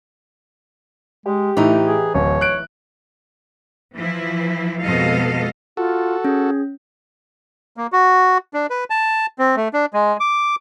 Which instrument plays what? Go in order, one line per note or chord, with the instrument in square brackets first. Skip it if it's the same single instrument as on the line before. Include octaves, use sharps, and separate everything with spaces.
[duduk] G#3 [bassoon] G4
[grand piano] A2 [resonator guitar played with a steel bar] E3 D#4 [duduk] A3
[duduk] G#4
[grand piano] D1 [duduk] C#5
[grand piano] F#6 D7
[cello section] E3 F3 E4
F2 B2 G#3 A4 D#5 F5
[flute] F4 [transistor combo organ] F#4 A4
[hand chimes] C#4 [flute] G#4
[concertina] A#3
F#4
D4
B4
A5
C4
A3
D4
G#3
D6